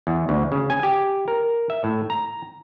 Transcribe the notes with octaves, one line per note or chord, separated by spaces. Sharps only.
E2
D2
C#3
G#5
G4
A#4
E5
A2
A#5